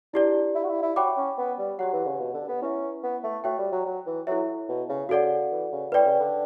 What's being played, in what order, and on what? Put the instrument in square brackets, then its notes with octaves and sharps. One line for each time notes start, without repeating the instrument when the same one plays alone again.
[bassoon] D4 [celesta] E4 G4 D5
[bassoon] E4
F#4
E4
E4
[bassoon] F#4 [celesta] C#5 G5 B5 D6
[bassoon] C#4
B3
G3
[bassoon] F#3 [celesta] G4 C#5 F#5
[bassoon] E3
C#3
B2
D3
B3
[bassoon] C#4 [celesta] E4 B4 E5
[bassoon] B3
A3
[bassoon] A3 [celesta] F#4 C#5 G5
[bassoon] G3
F#3
F#3
E3
[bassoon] F#3 [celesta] E4 A4 C#5 E5
[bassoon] B2
C#3
[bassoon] C#3 [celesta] F#4 A4 D5 F#5
[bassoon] E3
C#3
[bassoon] A2 [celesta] B4 D5 G5
[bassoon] C#3
D3